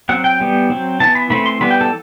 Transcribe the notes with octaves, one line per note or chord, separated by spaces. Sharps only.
F#3 C4 F#5
G5
E3 G3 B3
F#3 C4
E3 B3 A5
B5
E3 A3 C4 B5
C6
E3 G3 B3 B5
G5
A4